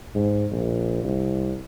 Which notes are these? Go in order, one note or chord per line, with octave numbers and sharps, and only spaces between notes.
G#2
A#1
C2